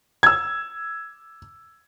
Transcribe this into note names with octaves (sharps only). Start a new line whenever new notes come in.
E6 G#6